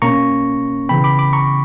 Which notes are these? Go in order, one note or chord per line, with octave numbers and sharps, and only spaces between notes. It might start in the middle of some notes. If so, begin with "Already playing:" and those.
B2 A#3 C#4 A#5 C#6
C#3 E3 B3 G5 B5
B5 D6
B5 D6
A#5 C#6